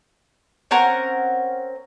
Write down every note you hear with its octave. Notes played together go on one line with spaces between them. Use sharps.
C4 C#4 A#4 F#5